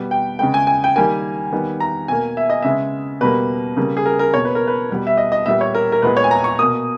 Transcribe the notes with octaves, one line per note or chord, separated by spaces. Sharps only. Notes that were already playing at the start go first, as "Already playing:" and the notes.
Already playing: B2 G3 B3
G5
C#3 G#3 B3 G5
G#5
G#5
G5
D#3 G3 A#3 G#5
D#3 G3 B3
A#5
B2 A#3 G#5
E5
D#5
C#3 G#3 B3 E5
B2 G3 A#3 B4
C#3 G3 A#3
G#4
A#4
A#4
B2 A#3 C#5
B4
A#4
B4
B2 G3 B3
E5
D#5
D#5
A#2 G3 B3 E5
C#5
A#4
A#4
A#2 G#3 B3 B4
C#5
G#5
A#5
C#6
B2 A#3 D#6